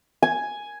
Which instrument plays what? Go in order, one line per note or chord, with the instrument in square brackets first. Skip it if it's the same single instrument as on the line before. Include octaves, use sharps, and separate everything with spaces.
[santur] G#5